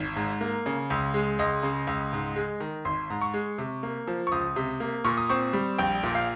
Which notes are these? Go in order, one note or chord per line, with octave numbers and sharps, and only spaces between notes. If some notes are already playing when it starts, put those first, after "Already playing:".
Already playing: G#1
G#2
A#3
C#3
C#2
G#3
C#2 D#5
C#3
C#2
G#2
G#3
D#3
G#1 C6
G#2
C#6
G#3
C3
A#3
F3
C#6
C#2 D#6
C3
A#3
A#2 C#6
D#6
C4 C#6
G3
A#1 G5
A#2
F5